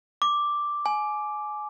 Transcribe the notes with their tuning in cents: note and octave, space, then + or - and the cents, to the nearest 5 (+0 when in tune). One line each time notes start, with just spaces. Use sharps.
D6 +0
G#5 +25